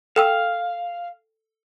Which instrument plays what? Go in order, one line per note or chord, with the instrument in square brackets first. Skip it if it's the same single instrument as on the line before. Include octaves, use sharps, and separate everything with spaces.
[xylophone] A4 G5 E6 [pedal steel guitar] F5